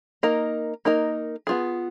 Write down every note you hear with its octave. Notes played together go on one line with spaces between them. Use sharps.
A#3 D#4 A#4 D#5
A#3 D#4 A#4 D#5
B3 F4 G#4